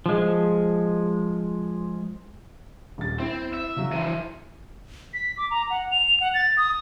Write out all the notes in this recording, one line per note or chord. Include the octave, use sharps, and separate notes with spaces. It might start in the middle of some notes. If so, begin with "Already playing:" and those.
F3 G#3
D#1 A6
C4 E4
E5
C#3 F#3
E3 F3 D#7
B6
D6
A#5
F#5
F7
F#5
A6
D#6